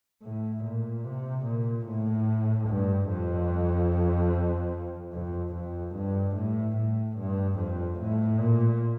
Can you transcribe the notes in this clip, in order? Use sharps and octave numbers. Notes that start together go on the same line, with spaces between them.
A2
A#2
C3
A#2
A2
G2
F2
F2
F2
G2
A2
A2
G2
F2
A2
A#2